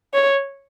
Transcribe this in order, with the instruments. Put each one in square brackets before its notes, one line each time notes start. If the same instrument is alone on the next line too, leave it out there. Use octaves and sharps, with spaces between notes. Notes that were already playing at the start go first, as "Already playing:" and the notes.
[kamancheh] C#5